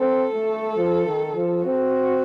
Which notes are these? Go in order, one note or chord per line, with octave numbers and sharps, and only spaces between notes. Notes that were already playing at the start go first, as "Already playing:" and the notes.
Already playing: C4 A4
A3
F3
D#3
F3
C4 F#4